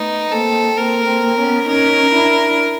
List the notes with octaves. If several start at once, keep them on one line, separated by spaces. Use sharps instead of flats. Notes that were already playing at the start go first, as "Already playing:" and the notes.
Already playing: A3 B3 D#4
A#3 C4 A4
A#3 C4 A#4
A#3 C4
B3 C#4
C#4 D#4 A#4
D4 E4